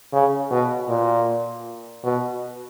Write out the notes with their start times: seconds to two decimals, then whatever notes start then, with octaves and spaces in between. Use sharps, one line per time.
0.13 C#3
0.51 B2
0.89 A#2
2.04 B2